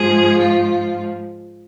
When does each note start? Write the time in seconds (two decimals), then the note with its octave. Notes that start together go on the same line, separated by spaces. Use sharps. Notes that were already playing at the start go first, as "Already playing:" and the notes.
Already playing: G#2 F3 G#4
0.37 F4